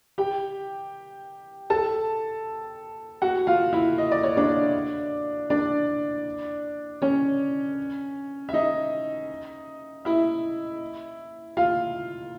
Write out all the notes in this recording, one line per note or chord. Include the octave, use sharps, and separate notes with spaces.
G4 G5
A4 A5
F#4 F#5
F4 F5
E4 E5
D#5
D5
C#5
D4 D5
D4 D5
C#4 C#5
E5
D#4 D#5
E4 E5
F4 F5